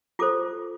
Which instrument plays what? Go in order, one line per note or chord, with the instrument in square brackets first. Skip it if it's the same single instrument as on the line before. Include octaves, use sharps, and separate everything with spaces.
[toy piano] F4 A4 C5 D6